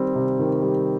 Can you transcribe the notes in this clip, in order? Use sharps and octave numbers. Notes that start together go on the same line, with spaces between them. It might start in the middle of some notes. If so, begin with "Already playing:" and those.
Already playing: D#3 G3 C4
C3
D#3
G3